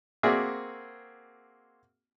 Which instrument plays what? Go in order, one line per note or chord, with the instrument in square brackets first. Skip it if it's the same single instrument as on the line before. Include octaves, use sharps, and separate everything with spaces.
[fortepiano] A#3 C4 F#4 G#4 D5 E5